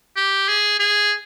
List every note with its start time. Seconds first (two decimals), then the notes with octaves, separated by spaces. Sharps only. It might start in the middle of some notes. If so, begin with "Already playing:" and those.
0.16 G4
0.48 G#4
0.79 G#4